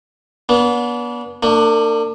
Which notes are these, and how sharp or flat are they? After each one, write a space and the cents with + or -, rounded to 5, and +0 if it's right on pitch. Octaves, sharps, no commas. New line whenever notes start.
B3 -35 D4 -35
A#3 -40 D4 +20